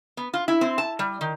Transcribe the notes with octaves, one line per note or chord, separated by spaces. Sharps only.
B3
F4
E4
C4
A5
G3
D#3